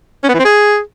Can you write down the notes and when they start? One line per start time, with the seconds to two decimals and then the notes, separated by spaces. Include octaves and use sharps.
0.23 C#4
0.29 B3
0.34 E3
0.39 C4
0.45 G#4